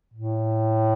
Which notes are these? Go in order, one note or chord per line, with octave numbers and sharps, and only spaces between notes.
A2